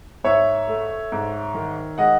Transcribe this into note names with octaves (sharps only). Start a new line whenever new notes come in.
G#2 C#5 E5
A3
G#2
D#3
G#3 D#5 F#5